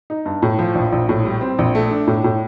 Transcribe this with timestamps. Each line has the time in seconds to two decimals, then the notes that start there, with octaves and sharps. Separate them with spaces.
0.10 D#4
0.26 G2
0.43 A2
0.59 F3
0.75 A#1
0.92 A#1
1.09 A2
1.25 G3
1.41 C4
1.59 A#1
1.75 A3
1.91 D4
2.07 A2
2.24 A2